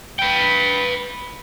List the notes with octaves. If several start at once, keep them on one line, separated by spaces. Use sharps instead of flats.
B4 G5